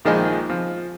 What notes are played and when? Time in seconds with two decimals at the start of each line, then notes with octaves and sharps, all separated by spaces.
0.05 A#1 D#3 F3 G#3 D#5 G#5
0.50 F3